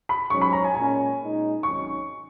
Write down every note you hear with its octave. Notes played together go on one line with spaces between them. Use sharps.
B5
G#2 F#3 C#4 C#6
B5
A#5
G#5
A#2 G#3 C#4 G#5
A#2 G#3 D#4
G#1 G#2 F#3 C#4 C#6